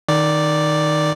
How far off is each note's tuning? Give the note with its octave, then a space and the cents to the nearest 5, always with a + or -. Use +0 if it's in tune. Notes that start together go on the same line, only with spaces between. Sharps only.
D#3 +0 D5 +0